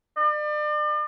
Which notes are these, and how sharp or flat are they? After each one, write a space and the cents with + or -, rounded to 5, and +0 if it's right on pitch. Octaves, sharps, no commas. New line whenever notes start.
D5 +40